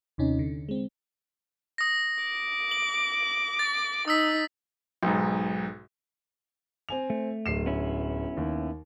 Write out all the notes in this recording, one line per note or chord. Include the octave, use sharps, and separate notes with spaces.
D#2 C3 C#4 D#4
D3
G#3 C4
D#6 A#6
D6
F#7
A6
D#4 D#6 E6 B6
B1 G#2
C4 G#5 F7
A3
D1 C7 E7
B3 C#4 E4
D#2